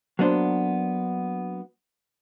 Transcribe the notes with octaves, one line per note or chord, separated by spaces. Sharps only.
F#3 A#3 B3 D4 C5